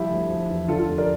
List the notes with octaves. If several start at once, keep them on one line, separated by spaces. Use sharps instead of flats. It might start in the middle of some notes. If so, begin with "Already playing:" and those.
Already playing: C2 F3 E4 G4
D2
F3
E2
D3 F4 A4
F4 A4
F1
A#4 D5